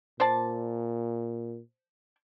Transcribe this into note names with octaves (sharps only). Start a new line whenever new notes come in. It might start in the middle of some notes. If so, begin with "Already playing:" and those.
A#2 C5 D5 A5